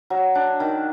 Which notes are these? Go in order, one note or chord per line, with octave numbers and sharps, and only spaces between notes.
F#3
D4
D#3